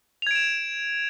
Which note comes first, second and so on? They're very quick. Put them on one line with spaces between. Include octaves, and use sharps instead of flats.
F7 G#6 D7 E7